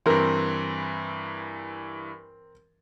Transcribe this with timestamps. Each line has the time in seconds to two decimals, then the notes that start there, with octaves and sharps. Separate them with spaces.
0.06 G2 E3 C4 A#4